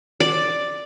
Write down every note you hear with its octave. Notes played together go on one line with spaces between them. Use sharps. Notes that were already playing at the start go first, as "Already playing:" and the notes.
D5